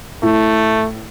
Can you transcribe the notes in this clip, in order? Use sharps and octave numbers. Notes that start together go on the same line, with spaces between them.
A2 A3